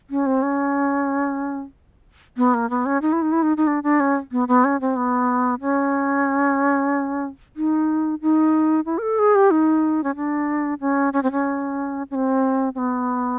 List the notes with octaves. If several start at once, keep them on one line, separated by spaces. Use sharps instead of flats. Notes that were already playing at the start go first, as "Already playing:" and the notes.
C#4
C4
C#4
B3
A#3
B3
C#4
D#4
E4
D#4
E4
D#4
D#4
D4
D4
C#4
B3
B3
C#4
C4
B3
C#4
D#4
D#4
E4
A#4
A4
G#4
G4
D#4
C#4
D4
C#4
C#4
C4
C#4
C#4
C4
C4
B3